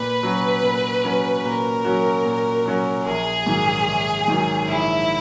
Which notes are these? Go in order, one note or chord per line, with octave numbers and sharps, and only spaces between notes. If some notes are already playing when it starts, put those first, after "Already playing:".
Already playing: A#2 B4
F#3 C#4 F#4
A#2
F#3 C#4 F#4
A#2 A#4
F#3 C#4 F#4
A#2
F#3 C#4 F#4
A#1 G#4
G#2 D#3 F#3
A#1
G#2 D#3 F#3
A#1 E4